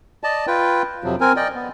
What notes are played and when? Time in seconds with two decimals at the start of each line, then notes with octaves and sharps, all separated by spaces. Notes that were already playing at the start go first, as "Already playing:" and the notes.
0.24 D5 D#5 A5
0.47 F4 B4 G5
1.04 F2 C3 F3 F#3
1.21 C4 A#4 G#5
1.36 D5 D#5 G5
1.55 B3